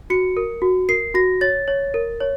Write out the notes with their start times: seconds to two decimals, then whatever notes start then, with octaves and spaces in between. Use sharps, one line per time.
0.10 F#4 C#7
0.37 A#4
0.62 F#4
0.89 A#4 C7
1.14 F#4 A#6
1.41 C#5 A6
1.68 C#5
1.94 A#4
2.20 C#5